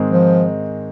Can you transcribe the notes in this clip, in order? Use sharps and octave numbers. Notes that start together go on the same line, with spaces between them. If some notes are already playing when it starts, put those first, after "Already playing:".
Already playing: G#2 D#3 G#3 C4 D#4
F3